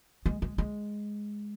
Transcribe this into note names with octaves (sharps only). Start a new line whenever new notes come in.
G#3
G#3
G#3